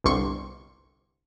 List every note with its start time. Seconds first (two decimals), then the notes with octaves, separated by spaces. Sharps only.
0.04 G1 C2 C6 C#6